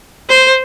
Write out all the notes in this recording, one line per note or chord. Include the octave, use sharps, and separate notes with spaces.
C5